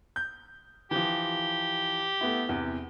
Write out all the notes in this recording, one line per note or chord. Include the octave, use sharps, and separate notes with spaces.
G6
E3 F3 G4
A3 B3 E4
E2 C3